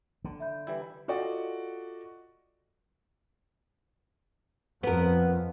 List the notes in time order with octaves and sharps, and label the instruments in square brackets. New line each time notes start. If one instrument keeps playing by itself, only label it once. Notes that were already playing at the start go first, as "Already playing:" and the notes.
[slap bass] D3
[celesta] E5 B5 G6
[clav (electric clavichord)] E3 G3 E4
[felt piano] F4 F#4 A4 D5 D#5 F#5
[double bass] F2 [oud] B3 A#4